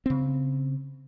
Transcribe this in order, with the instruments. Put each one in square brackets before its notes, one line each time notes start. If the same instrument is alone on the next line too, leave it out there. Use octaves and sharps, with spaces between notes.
[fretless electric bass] C#3 C4